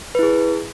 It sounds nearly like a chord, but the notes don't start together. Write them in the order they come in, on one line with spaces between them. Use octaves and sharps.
B4 E4 G#4